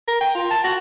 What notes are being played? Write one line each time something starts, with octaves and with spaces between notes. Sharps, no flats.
A#4
G5
F4
A5
F#4